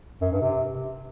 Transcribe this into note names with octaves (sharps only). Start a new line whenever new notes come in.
F#2
G2
C3